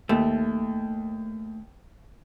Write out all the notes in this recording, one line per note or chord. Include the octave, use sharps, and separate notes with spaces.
D#2 A3